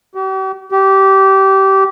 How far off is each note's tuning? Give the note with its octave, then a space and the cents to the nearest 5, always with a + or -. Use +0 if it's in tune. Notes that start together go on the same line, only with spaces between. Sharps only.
G4 -45
G4 -20